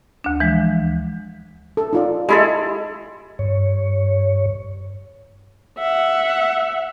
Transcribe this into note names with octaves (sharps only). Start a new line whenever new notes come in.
D2 D4
E3 F3 G#3
A4
D#4 F4 D5
G#3 E4 G4 A4 B5
G2 C#5
E5 F#5